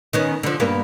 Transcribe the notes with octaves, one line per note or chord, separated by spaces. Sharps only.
D#3 B3 C#4
D3 F3
G2 A#3 B3